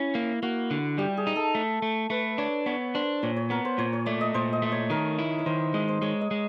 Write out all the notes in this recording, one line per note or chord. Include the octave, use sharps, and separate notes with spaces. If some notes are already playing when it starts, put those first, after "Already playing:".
Already playing: C#4 E4
A#3
A#3 F#4
D3
G3 G4
G#4
D#4
A4
A3
A3
A3 B4
D4 C#5
B3 C#5
D4 C5
A#2 C#5
C#5
B3 A#4
C5
A#2 C#5
C#5
A3 D5
D#5
A#2 C5
D#5
A3
C#5
D#3 A#4
E4
C#5
D#3 C5
G#3 D#5
C5
G#3 C#5
D#5
G#3